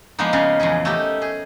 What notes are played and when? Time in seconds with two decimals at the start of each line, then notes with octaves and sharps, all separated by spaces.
0.18 F3 G#3 A#3 B3 D4 D#4
0.33 C#3 F5
0.59 E2 A#2 F3 G#4
0.85 A3 C#4 D#4 G4
1.22 G#4